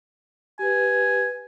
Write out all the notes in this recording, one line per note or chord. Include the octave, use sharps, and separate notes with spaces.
G4 B4 G#5